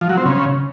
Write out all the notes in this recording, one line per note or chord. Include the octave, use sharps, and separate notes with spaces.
F3
F#3
C4
C#3